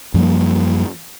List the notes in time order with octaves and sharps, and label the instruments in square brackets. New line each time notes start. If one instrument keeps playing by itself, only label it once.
[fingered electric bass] F#2 F3 G3 A#3